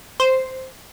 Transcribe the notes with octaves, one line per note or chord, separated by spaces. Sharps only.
C5